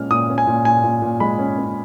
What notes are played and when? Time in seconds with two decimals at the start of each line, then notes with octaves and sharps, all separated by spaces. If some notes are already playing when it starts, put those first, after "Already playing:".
Already playing: A#2 G#3 C#4 F6
0.10 A#2 D#6
0.30 C#4
0.38 G#5
0.47 A#2
0.65 A#2 G#5
0.84 A#2
1.02 A#2
1.20 G#3 B5
1.39 C#4
1.58 C#4